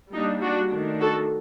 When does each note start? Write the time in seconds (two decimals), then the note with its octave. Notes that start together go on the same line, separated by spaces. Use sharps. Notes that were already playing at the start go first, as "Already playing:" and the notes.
0.12 G3 A#3 D4 D#4
0.42 D4 F#4
0.71 D#3 A3 D4
1.01 F#4 A4